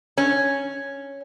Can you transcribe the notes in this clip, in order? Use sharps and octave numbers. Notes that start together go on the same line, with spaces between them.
C#4